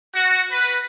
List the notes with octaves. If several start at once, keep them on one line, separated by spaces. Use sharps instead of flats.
F#4
B4